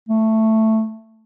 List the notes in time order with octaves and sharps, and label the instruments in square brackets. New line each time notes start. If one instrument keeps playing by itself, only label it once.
[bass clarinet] A3